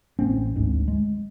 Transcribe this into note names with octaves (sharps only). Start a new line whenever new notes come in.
A1 A#3 C4 C#4
G#1 D2 G#2
G#3